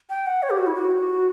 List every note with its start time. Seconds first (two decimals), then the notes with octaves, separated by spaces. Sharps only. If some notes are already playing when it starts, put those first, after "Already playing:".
0.10 G5
0.26 F#5
0.43 C#5
0.50 G4
0.58 F#4
0.67 E4
0.75 F#4